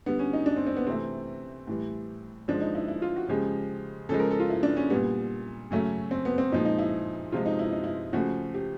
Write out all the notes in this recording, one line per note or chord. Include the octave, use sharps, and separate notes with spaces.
D3 G3 B3
C#4
D#4
D4
C4
C4
B3
C3 E3 A3 C4
A2 E3 G3
D3 F3 G#3 D4
D#4
E4
E4
F4
F#4
C#3 F3 G#3 G4
C#3 F3 G#3 A4
A#4
A4
F4
E4
D4
C#4
A#2 G3 B3
C#3 F#3 A3 C#4
C4
B3
C4
A#2 F3 G#3 D#4
D#4
E4
C3 F3 G#3 F4
D#4
E4
D#4
E4
C#3 F3 A3 F#4
G4